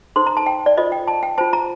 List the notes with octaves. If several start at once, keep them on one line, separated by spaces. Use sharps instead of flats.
D#4 A4 C5 C6
A#5
A5
G5
D5
F4 A4 C5 D#5
G5
A5
G5
F4 C5 A5
A#5